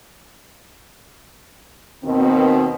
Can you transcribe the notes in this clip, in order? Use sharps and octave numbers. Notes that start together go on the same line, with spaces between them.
D#2 B2 D#3 C4